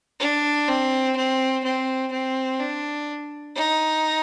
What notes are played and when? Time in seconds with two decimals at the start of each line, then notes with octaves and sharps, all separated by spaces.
0.20 D4
0.68 C4
1.16 C4
1.64 C4
2.12 C4
2.59 D4
3.56 D#4